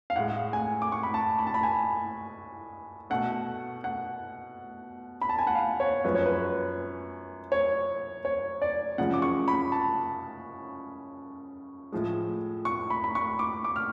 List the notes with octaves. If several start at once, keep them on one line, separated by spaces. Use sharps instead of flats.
F5
A2 G#3 F#5
G#5
D6
C#6
B5
A5
B5
A5
B5
G#5
B2 A3 F#5
F#5
B5
A5
G#5
F#5
F5
C#5
F#2 F3 G#3 B4
C#5
B4
C#5
C#5
D5
F#2 C#3 F3 G#3 F#5
D6
C#6
B5
A5
A2 F3 G#3
C#6
B5
B5
C#6
D6
D6
F6